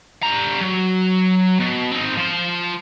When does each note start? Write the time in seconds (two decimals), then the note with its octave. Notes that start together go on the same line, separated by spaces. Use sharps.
0.23 G3 A#5
0.61 F#3
1.59 B2
1.92 C4 D#4
2.17 F3 C5